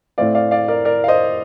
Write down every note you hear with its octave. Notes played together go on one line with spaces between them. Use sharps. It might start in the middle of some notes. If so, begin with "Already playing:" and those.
A2 A3 C4 D5 F5
D5 F5
D5 F5
A#4 D5
A#4 D5
F5
C5 D#5